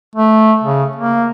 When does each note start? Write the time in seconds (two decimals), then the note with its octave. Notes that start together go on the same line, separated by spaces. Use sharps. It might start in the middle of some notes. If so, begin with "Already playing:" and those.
0.16 A3
0.63 C#3
0.96 A#3